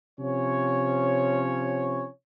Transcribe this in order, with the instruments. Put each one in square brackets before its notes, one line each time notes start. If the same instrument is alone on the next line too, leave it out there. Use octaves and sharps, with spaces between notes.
[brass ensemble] C3 F3 C#4 C#5